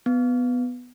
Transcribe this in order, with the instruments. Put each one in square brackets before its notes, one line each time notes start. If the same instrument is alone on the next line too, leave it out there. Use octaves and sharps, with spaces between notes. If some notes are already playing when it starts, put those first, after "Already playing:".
[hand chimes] B3